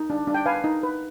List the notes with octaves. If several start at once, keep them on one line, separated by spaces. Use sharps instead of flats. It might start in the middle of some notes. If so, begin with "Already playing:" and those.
Already playing: D#4
D4
D4
G5
B4 F5 G#5
D#4
B4